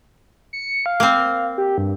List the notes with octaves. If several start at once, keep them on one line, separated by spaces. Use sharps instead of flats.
C#7
F5
A#3 C4
G4
G2